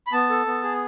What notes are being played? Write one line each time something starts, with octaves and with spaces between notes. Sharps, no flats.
B5
B3 A5
A4
B3
G#4